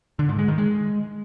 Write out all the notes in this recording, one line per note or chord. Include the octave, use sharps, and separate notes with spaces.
D3
G#2
G#3
D#3
G#3